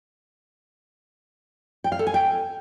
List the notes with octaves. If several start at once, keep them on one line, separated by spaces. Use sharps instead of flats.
G5
F5
A4
G#5
G5